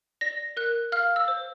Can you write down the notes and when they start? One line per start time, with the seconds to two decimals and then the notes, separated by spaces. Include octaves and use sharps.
0.21 D5 A#6
0.57 A#4 F#6
0.92 F5 F6
1.16 E6
1.28 C5